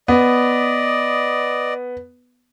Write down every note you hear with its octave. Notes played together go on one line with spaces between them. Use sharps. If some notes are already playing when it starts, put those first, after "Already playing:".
B3 D5 D#5